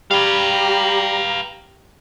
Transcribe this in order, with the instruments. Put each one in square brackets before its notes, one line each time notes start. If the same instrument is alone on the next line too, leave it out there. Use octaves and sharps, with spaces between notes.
[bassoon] G3 [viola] G4 A#5 [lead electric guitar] B4 F5